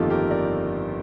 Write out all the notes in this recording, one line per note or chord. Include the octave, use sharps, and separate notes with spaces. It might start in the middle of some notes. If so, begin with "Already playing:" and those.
Already playing: G1 F2 D#3 A#3 D#4 F4 G4 A4
G4 A#4
A#4 D5